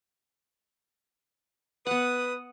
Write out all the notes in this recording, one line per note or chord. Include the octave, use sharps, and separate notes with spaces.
B3 B4 F#5 D#6